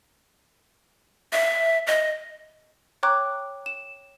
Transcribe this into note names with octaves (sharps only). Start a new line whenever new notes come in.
E5
D#5
C#5 G5 A#5 C#6 D6 F#6
E7